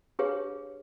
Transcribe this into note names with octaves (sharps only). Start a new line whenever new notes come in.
D4 G4 G#4 B4 C#5 F5